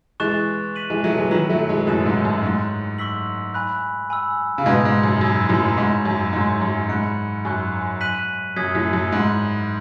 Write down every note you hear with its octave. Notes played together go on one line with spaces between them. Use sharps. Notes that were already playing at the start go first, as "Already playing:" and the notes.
E3 G#3 C#6 F#6 A6 E7
F#6 B6 D#7 F#7
E3 G#3
F#3 A3
E3 G#3
D#3 F#3 G#5 B5 E6 B6 F#7
F#3 A3
E3 G#3
F#2 A2 D#6 F#6 A6 C#7 E7
G#2
F#2
G#2 C#6 F#6 A6
C#6 E6 B6 F#7
G#5 B5 F#6
G#5 B5 E6
C#3
G#2 B2 G#5 D#6 G#6
G#2
F#2
F#2 B5 E6 G#6
F#2 A2
G#2 G#5 C#6 G#6 B6 E7
F#2
G#2 C#6 G#6 C#7
F#2
G#2 B5 F#6 C#7
F#2 G#5 C#6 F#6
F#6 B6 D#7 F#7
F#2 D#6 G#6 B6
F#2 A2
F#2
G#2 B5 F#6 B6 F#7